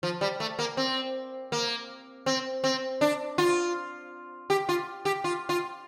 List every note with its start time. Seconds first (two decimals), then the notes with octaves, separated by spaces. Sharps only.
0.03 F3
0.21 G3
0.40 A3
0.59 A#3
0.77 C4
1.52 A#3
2.26 C4
2.64 C4
3.01 D4
3.38 F4
4.50 G4
4.69 F4
5.05 G4
5.24 F4
5.49 F4